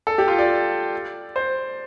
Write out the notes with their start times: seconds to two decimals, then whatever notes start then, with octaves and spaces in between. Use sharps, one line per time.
0.07 A4
0.18 G4
0.28 F4
0.39 D5
1.36 C5